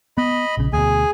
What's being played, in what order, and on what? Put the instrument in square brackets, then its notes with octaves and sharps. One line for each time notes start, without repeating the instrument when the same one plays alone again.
[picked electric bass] B3 [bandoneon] D#5 B5
[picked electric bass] A#1 C#3
[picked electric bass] D2 B2 [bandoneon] G#4 G#5